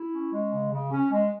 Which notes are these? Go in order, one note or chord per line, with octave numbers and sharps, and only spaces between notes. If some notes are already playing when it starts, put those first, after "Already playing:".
Already playing: E4
C#4
G#3
C#3
C#3
C#4
G#3